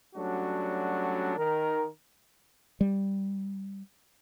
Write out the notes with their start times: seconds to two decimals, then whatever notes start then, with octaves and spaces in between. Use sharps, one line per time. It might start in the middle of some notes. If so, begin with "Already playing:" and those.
0.16 F#3 G3 A3 C#4 D4 F#4
1.37 D#3 A#4
2.81 G3